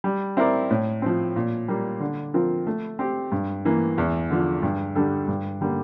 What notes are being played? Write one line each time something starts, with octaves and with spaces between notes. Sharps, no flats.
G3
C4 E4 A#4 D5
A2
F3 C4
A#2
G3 A#3
D3
F3 C4 F4 A#4
A3
C4 G4
G2
E3 A#3
E2
D3 F3
G2
D3 G3 D4 A4
G2
D3 G3 A#3